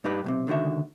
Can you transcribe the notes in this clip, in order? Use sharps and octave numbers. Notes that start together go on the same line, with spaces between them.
G2 D#4 G4 B4
B1 A2 C3
C#2 D3 D#3 F#4 E5